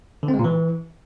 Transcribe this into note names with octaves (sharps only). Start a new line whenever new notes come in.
D3
C4
G#3
A#2
E3